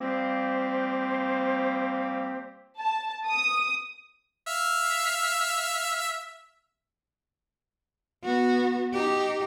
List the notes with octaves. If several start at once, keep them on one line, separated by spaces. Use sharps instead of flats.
F3 G3 A#3 C4 G4 C5
A5
D#6
E5 F5
B3 F#4
D#4 G4